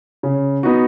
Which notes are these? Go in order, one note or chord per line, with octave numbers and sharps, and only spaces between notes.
C#3
B3 D#4 F#4